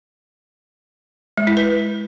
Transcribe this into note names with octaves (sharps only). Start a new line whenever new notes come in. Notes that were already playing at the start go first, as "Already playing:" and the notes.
G#3
E4
B4